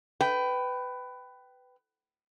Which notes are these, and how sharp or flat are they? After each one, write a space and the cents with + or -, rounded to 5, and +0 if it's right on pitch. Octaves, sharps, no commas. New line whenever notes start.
B4 +15 G5 -15